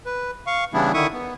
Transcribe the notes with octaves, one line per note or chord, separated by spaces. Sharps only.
B4
F5 C#6
C#3 E3 G3 B3 D4 E4
D3 D#3 E4 E5 C#6 D#6
B3